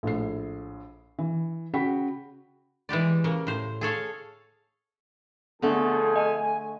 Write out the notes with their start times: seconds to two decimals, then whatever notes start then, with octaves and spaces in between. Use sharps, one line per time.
0.03 A#1 A2 C7
1.19 E3
1.74 C#3 F#4 G5 B5 B6
2.89 E3 G#3 G4 D5
3.24 C#3 A#3
3.47 A2 C5
3.81 G#4 A4 C#5 F5
5.62 F2 D3 A3 B3 G#4 A4
6.16 D#5 G#5